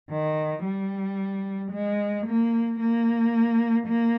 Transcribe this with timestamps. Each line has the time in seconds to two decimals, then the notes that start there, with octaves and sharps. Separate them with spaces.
0.10 D#3
0.64 G3
1.71 G#3
2.26 A#3
2.80 A#3
3.87 A#3